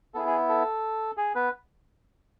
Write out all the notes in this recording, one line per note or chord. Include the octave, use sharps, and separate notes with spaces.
B3 E4 G#4 A4
G#4
A4
G#4
B3 B4